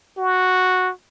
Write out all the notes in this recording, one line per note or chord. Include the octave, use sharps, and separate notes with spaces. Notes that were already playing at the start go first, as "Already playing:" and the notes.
F#4